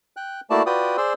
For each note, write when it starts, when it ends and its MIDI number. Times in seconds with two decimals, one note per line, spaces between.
0.17 0.41 79
0.17 0.41 90
0.50 0.63 57
0.50 0.63 58
0.50 0.63 64
0.50 0.63 66
0.50 0.63 74
0.50 0.63 81
0.66 0.97 65
0.66 0.97 66
0.66 0.97 71
0.66 0.97 74
0.66 0.97 79
0.66 0.97 87
0.97 1.13 68
0.97 1.13 72
0.97 1.13 74
0.97 1.13 84
0.97 1.13 88